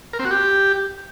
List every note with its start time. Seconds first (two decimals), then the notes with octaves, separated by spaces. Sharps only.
0.13 A#4
0.19 C4
0.25 F#4
0.31 G4